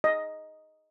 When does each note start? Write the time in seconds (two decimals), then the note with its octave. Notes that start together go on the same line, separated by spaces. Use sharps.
0.04 D#5